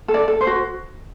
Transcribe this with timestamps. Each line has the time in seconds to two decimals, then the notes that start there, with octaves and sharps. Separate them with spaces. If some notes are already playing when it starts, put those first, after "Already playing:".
0.08 A4
0.14 D5
0.28 A4
0.41 C5
0.47 F#4